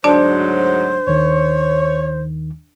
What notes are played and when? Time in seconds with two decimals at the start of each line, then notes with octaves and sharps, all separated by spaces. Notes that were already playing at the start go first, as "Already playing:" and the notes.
0.04 D2 G#2 F#3 D4 C5 D5 A5
1.07 D#2 D#3 C#5